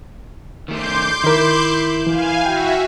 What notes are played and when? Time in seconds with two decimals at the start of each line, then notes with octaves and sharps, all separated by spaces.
0.68 D#3 A3 C6 D6 G6
1.24 D#3 E4 A#4
2.07 E3 F5 G#5
2.46 F#4 E5 G5